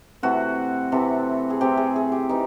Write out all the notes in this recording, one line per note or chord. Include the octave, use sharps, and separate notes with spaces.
C3 E3 A3 C4 F#4
C3 E3 A3 C4
G#4
C3 E3 A3 C4 G4
G#4
G#4
G4
C3 E3 D#4